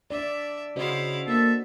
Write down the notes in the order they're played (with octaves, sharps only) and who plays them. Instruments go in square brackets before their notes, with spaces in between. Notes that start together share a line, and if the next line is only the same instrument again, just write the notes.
[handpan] D4 D5 [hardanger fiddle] E5
[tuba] C#3 [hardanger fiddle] E4 F5 [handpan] F#4 C5 D#5
[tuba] A#3 [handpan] D4 [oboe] A4 [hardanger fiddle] E5